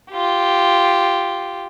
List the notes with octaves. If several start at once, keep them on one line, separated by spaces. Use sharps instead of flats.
F4 G4